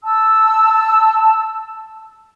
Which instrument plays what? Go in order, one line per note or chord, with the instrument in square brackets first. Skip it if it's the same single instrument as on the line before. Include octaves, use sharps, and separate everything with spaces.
[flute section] A5 E6